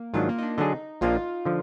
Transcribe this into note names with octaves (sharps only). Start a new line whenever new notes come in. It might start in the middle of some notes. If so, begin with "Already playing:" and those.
Already playing: A#3
G#2 D#3 F#3 D4 F4
A#3
D#4
D4
D3 F#3 D4 D#4 G#4
A#1 A#2 F3 A#3 D4 F4
D3 F3